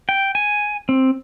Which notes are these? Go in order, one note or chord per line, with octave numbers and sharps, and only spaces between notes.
G5
G#5
C4